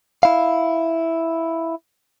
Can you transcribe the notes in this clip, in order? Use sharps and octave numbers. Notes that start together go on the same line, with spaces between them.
E4 F5